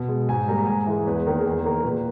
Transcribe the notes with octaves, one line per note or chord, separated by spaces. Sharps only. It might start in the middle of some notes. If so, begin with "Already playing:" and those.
Already playing: B2
G#3
G#2 G#5
G3 A#3 A#5
A#5
G#2 G#5
E3 G#3
E2 B4
D#3 A#3 A#4
G#4
E2
A#4
D#3 A#3
A#2 B4